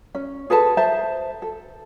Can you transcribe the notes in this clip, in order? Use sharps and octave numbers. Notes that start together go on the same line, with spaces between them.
C#4
G#4 A4 B4 A5
C5 E5 A5
A4